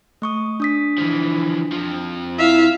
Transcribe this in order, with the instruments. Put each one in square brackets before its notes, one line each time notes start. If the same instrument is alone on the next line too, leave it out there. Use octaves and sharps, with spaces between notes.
[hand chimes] A3 C#6 D#6
D4 D#6 B6
[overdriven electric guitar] E3 F3
F2 F3
[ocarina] E4 [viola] E5 F5